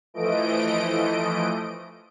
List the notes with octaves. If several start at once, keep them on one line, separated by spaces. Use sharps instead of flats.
E3 F3 A3 D#5 D7